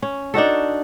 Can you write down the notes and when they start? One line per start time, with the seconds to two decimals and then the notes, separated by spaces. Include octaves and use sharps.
0.02 C#4
0.34 D4 D#4 F#4 A4